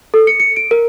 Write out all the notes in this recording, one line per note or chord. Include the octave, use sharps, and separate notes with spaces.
A4
C#7
C#7
D7
A#4